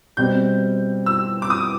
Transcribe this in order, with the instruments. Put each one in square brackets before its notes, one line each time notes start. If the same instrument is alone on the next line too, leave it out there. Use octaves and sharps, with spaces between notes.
[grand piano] B2 G3 C4 [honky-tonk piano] G6
[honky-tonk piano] E6
D6
D#6